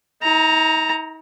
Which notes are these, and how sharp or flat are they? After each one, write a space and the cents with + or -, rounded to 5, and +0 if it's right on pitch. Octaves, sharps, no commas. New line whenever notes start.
D#4 +40 A#5 +0